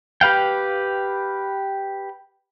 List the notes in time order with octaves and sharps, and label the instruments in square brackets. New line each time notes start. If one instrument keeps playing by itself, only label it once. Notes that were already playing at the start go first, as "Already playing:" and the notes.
[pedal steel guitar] G4 B4 F5 G5